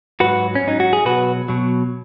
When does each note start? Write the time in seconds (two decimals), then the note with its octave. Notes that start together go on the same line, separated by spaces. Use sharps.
0.20 G#2 F#3 F#4 B4
0.55 C#4
0.64 G#2 F#3 D#4
0.80 F#4
0.93 G#4
1.05 B2 F#3 F#4 B4
1.48 B2 F#3